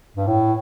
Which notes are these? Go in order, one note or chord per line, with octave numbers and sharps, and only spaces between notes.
G2
A2